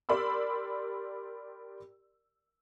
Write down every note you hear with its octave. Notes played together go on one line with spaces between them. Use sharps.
G4 A#4 D5 B5 C6 E6